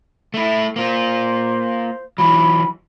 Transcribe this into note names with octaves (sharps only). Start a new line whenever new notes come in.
A3 E4
A#3 F4 C5
E3 F#3 B5